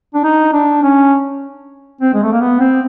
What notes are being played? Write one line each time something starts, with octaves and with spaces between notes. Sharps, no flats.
D4
D#4
D4
C#4
C4
G#3
A3
A#3
B3
C4